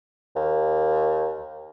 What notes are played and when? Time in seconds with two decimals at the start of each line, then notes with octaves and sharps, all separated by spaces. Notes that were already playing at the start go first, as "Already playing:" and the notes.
0.36 D#2